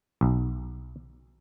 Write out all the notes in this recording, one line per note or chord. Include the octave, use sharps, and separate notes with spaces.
B1